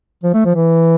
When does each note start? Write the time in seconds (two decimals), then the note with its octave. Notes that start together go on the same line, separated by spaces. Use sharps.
0.24 F3
0.34 A3
0.45 F3
0.55 E3